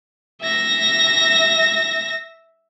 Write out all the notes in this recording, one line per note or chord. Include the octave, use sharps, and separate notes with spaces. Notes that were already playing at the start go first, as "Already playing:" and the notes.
E5 A#6